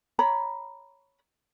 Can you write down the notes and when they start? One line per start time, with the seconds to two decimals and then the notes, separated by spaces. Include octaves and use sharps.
0.19 C#5 A#5 B5